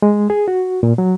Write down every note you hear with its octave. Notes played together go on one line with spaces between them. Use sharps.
G#3
G#4
F#4
A#2
F#3